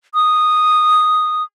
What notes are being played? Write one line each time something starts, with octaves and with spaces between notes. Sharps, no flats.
D#6